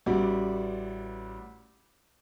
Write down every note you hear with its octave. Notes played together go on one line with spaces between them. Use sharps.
A1 G3 F#4 D5